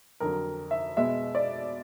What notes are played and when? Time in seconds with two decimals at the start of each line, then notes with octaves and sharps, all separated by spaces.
0.20 F2 D3 F#3 A#4
0.71 E5
0.97 B2 G#3 B3 E5
1.35 D5